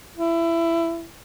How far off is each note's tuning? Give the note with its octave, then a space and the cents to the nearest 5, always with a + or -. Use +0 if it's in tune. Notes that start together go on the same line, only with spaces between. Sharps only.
E4 +20